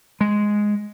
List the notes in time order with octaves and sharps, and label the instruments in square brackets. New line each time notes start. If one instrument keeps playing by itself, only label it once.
[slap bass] G#3